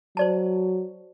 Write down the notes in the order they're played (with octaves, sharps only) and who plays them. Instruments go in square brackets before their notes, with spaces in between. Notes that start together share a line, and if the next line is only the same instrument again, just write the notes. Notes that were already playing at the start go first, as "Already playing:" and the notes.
[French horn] F#3 [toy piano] C5 D5 A5